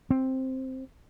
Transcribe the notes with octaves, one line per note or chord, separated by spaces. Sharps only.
C4